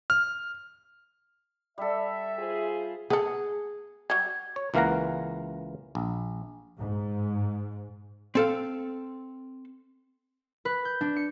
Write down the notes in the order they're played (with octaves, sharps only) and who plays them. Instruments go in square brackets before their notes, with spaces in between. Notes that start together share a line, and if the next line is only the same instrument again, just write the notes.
[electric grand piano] F6
[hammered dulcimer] G3 A4 [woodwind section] E5
[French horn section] F4 G#4 C5
[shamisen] B3 A4 [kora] G#4
[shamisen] F#3 G3 [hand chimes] G#6
[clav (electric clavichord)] C#5
C#2 E3 A#3 F5 F#5 A#5
A#1
[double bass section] G#2
[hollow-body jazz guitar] C4 A4 F5
[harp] B4
G6
D4
C#7